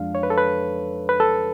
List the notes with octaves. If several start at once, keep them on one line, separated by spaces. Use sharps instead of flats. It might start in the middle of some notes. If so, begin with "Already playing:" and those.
Already playing: F2 F3 G#3 D4 F5
C#5
B4
A4
B4
B4
A4